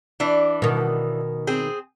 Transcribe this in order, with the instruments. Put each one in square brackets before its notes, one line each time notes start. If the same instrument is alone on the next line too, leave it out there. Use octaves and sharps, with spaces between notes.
[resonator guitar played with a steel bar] E3 D4
[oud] B2 D#3
[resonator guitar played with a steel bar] C4 G#4